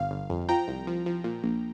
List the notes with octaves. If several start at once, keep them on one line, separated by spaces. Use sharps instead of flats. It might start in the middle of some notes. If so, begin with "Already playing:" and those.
Already playing: G1 F5
G1
F2
F3 G5 A#5
C2
F3
F3
A#2
A#1